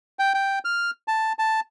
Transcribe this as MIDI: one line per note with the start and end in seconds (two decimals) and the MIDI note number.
0.19 0.34 79
0.34 0.59 79
0.65 0.91 89
1.08 1.33 81
1.39 1.60 81